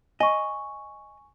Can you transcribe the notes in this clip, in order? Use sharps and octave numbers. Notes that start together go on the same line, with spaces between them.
D#5 G#5 C#6